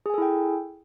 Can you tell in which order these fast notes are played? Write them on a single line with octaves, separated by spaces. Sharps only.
G#4 G#5 A4 E4 G5